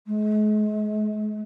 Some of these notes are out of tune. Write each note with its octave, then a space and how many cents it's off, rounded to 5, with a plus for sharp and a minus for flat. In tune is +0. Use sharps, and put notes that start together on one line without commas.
G#3 +40